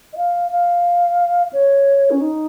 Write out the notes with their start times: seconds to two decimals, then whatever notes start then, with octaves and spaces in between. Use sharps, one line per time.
0.13 D#5
0.17 F5
0.51 F5
1.53 C#5
2.11 C#4
2.21 D#4